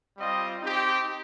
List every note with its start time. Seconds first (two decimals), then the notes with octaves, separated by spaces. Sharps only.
0.17 G3 C4 F4 D#5
0.63 C4 D#4 G4